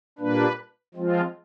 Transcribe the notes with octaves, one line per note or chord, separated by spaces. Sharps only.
A#2 G3 A#3 D4 B4
F3 G#3 C4 F4